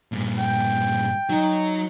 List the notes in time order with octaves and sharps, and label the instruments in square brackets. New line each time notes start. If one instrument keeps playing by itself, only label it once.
[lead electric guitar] G2 A#2
[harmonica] G5
[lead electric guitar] F#3 [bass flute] D#4